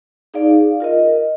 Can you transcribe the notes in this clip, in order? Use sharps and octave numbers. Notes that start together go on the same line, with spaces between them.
D#4 G#4 D5 F5
F4 A#4 D#5